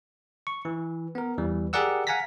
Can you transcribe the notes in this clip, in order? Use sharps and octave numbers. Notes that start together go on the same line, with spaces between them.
C#6
E3
B3 A#4
E2 E3 G3
G4 G#4 A#4 D5 F#5 E6
F5 F#5 G#5 A#5 A#6 B6